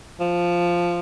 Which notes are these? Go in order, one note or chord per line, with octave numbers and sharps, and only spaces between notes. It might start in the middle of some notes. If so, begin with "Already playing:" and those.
F3